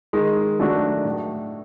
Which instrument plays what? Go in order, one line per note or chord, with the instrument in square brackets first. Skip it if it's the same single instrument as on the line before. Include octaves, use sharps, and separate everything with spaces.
[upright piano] D#3 [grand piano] G#3
[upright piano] F#3 A3 D4 F#4
A2